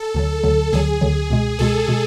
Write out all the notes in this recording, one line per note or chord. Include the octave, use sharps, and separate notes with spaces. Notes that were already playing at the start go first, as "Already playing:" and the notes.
Already playing: A4
D2 D3 F#3
D2 D3 F#3
D2 D3 F#3 G#4
D2 D3 F#3
C#2 B2 G#3
C#2 B2 G#3 A4
B2 G#3